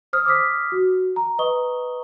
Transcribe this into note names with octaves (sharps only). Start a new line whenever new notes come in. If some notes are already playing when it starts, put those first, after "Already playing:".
C5 D#6 F6
D6 D#6 F6 B6
F#4
A#5
B4 D#5 A#5 C#6 D#6 G7